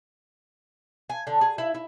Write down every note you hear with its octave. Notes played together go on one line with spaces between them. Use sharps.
G#5
D3
G#4
E4
E4